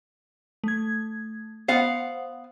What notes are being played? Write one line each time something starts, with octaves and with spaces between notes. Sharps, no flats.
A3 G#6
B3 C5 F5 F#5